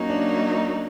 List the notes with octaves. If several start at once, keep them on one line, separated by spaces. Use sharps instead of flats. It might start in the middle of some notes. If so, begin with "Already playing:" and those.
Already playing: F#3 A#3 C#4 D#4
D4